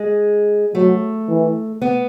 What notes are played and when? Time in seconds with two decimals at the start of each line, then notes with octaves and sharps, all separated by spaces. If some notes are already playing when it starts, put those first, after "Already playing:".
Already playing: G#3
0.74 F#3 A3
1.28 E3
1.82 B3